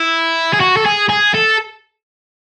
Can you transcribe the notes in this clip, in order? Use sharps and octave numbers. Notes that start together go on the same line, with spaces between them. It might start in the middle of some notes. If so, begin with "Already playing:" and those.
Already playing: E4
G#4
F#4
A4
G#4
G#4
A4